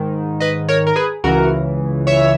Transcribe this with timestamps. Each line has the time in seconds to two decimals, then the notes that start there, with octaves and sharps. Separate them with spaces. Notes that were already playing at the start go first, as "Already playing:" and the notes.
Already playing: G#2 D#3
0.40 B4 D#5
0.69 A#4 C#5
0.87 A#4
0.96 G#4 B4
1.24 C#2 C#3 E3 F#4 A#4
2.07 C#5 E5